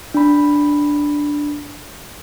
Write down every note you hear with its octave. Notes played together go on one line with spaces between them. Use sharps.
D4 B5